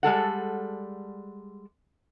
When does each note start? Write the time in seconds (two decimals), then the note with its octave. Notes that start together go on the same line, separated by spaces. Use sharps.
0.03 G3 G#3 A4 F#5